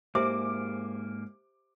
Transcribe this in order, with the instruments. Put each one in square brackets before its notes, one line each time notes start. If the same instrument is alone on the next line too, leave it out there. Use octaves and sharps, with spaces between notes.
[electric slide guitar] G#2 A#3 [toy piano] G4 C5 E5 [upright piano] D6